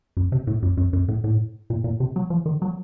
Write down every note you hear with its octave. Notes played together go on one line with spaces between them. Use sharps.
F#2
C3
A2
F#2
F#2
F#2
A2
A2
A#2
A#2
C3
F#3
F3
D#3
F#3